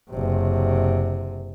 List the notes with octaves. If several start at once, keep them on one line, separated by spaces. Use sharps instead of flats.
F#1 C3